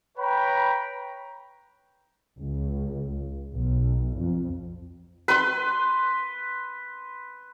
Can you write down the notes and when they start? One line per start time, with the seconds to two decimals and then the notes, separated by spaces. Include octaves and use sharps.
0.18 B4 C#5 G5 A#5 B5
2.39 C#2
3.54 B1
4.16 F2
5.28 B4 C6